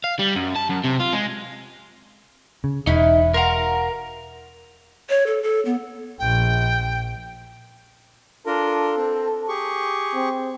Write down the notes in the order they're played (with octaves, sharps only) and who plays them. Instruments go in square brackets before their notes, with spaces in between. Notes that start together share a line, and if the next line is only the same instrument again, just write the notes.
[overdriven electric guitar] F5
G3
F#2
A5
F#2
C3
F4
G#3
[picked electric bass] C#3
[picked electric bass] E1 [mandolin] C#4 E4 B4 [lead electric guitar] D#4
[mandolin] F#4 F5 C6 [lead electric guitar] A#4 A#5
[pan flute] C#5
A4
A4
B3
[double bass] A#1 [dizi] G5
[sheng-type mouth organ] D4 F4 A#4 [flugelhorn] A4
[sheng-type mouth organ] C4
G4 G#4 C#6
[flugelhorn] C4